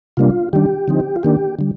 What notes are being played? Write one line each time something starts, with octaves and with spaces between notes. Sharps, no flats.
C3 G3 A#3 D4 F4
D#3 G3 D4 G4
D3 F3 C4 D#4
F4
D#3 A#3 D4 G4
D3 G3